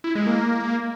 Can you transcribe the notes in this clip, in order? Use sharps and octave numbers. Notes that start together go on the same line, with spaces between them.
E4
G#3
A#3